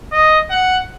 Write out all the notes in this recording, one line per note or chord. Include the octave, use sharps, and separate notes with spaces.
D#5
F#5